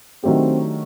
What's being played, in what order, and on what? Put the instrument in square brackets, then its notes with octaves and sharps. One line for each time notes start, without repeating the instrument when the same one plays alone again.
[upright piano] D#3 F#3 A3 D4 G4 [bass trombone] C4